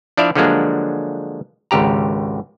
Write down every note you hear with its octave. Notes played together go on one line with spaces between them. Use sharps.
F3 D4 E4 D5 E5 F5
D3 F3 F#3 G#3 A#3 D4
G#1 C#2 G4 A#5